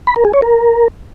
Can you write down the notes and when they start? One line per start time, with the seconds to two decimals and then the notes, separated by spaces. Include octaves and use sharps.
0.07 B5
0.16 A#4
0.25 G#4
0.33 C#5
0.42 A#4